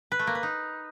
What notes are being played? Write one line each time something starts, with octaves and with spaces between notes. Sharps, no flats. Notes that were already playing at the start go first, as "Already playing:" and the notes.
B4
A3
A#3
B4
D#4